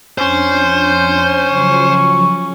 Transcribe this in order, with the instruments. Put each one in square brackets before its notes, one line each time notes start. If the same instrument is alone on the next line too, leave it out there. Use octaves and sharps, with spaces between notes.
[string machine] F2 D4 [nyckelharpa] C#4 [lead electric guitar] C5
[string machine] C#3 F3 F#3 [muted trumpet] C#6